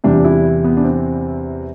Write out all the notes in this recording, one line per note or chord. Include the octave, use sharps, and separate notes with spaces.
E2 C3 E3 G3 D4
E4
B3
D4
C4